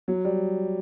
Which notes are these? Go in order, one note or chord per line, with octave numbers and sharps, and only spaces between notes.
F#3
G3